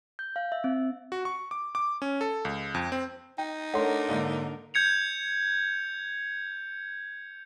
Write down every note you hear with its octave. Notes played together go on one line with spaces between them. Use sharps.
G6
F5
E5
C4
F#4
C#6
D6
D6
C#4
A4
C#2
F2
C4
D#4 G5
A3 D4 A4 A#4 C#5 F#5 A#5 C6
G#2 D3 A#3
G6 G#6 C#7 F7